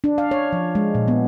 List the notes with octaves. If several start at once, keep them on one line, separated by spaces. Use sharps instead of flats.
D4
F5
C#5
F3
G#3
A#2
B3